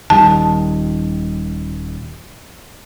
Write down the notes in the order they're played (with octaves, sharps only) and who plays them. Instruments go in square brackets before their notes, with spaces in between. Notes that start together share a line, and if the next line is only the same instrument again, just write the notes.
[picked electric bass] D#1 D#3 G3 [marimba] A5